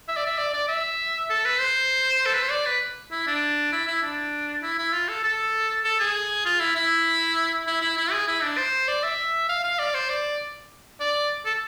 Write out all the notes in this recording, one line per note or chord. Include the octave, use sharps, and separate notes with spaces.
E5
D5
E5
D5
D5
E5
A4
B4
C5
A4
B4
C5
D5
B4
E4
D4
E4
E4
D4
E4
E4
F4
A4
A4
A4
G#4
F4
E4
E4
E4
E4
E4
G#4
E4
D4
C5
D5
E5
F5
F5
D5
C5
D5
D5
A4